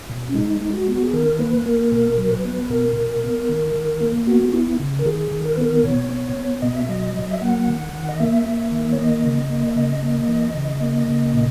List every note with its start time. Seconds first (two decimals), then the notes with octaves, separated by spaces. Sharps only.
0.09 B2
0.29 C#4
0.34 G#3 D#4
0.61 G#3
0.74 F#4
0.88 B3 F#4
1.03 G#4
1.13 D#3 A#4
1.39 A#3 B4
1.66 A#3 A#4
1.92 B2 A#4
2.18 F#3 A#4
2.31 B4
2.45 B3
2.70 B2 A#4
2.97 B2
3.23 B3
3.49 D#3
3.76 D#3
4.01 A#3
4.27 B3 F#4
4.50 F#4
4.53 B3 E4
4.79 C#3
4.99 A#4
5.05 D#3 G#4
5.32 D#3
5.45 A#4
5.53 B4
5.58 B3 A#4
5.84 B2 C#5
6.10 B3
6.36 B3
6.62 B2 D#5
6.76 E5
6.89 F#3 D#5
7.14 F#3
7.31 E5
7.41 A#3 F#5
7.68 D#3
7.93 D#3
8.09 D#5
8.20 A#3 E5
8.46 A#3
8.71 D#3
8.92 C#5
8.99 A#3 D#5
9.24 C#3
9.50 A#3
9.71 E5
9.76 C#3 D#5
10.02 A#3
10.28 E3
10.54 C#3
10.81 A#3
11.08 C#3
11.33 A#2